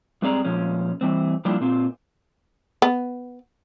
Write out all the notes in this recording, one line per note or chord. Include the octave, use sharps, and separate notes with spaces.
G2 G#3 C4 G#4 D5 A#5
A#2 F3 G#3 C#4
E3 G3 C4
F3 G3 A#3 D4 E4 F4
A#2 C4 F4
B3